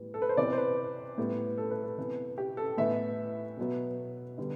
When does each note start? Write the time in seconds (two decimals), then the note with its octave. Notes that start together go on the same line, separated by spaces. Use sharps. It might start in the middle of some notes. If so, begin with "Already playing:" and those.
Already playing: A2 E3 G3 B3
0.14 A4
0.22 B4
0.29 C5
0.37 C3 E3 B3 D5
0.53 C5
0.58 B4
1.18 A2 G3 B3
1.58 A4
1.71 B4
1.83 A4
1.98 C3 E3 B3
2.38 G4
2.57 A4
2.77 A2 E3 B3 E5
3.57 B2 F#3 B3
4.38 D3 G3 B3